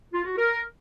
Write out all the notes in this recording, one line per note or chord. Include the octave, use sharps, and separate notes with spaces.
F4
F#4
A#4